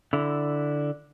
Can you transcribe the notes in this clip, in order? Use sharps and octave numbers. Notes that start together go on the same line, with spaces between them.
D3 E4